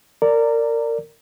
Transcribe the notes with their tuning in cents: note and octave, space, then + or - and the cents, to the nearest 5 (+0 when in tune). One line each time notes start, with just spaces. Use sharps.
A#4 -25 D5 -5 A#5 -20